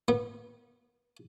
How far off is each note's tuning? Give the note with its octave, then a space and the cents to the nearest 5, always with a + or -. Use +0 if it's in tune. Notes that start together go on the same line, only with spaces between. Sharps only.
B3 -30